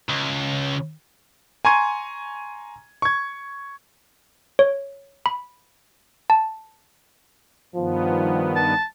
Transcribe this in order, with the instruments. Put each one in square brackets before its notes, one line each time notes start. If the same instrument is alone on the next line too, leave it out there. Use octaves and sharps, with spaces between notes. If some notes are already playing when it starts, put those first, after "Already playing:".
[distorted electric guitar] C#2
[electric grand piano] G#5 A#5 C6 C#6 G#6 D#7
C#6 G#6
[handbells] C#5
B5
A5
[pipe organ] G2 D#3 B3 [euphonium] F3
[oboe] A5